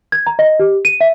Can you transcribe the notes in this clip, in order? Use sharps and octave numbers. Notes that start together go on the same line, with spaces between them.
G#6
A#5
D#5
G4
D#7
E5